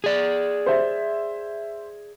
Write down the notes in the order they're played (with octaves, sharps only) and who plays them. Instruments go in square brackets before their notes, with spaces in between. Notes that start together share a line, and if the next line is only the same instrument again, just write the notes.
[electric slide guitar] G#4 D5
[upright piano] C5 E5